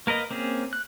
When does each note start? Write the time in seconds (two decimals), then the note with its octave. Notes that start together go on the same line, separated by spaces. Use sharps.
0.07 A#3 A#4 B4 D#5
0.31 A#3 C4 C#4 G#4
0.73 F#6